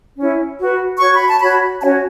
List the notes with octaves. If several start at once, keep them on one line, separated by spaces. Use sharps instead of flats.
C#4 E4 C#5
F#4 B4
F#4 C#5 C#6
B5
A5
F#4 C#5 B5
C#4 F#4 C#5 A5